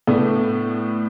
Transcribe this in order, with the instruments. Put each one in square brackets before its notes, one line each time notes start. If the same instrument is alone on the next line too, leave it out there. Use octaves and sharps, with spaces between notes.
[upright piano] A2 A3 B3 D4